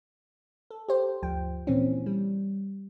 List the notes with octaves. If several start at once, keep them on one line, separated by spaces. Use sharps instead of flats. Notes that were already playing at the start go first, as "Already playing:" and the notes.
A4
G4 C5
G1 D2 F3 G5
A#2 E3 C4 C#4
G3